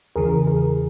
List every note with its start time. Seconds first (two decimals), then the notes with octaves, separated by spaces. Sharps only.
0.16 E2 C#3 E3 G#4 A#4
0.47 G#4 A#4